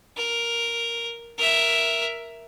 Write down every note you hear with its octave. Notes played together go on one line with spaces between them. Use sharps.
A#4
A#4 E5